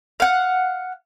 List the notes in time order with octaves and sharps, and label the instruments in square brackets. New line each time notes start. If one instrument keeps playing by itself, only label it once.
[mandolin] F5 F#5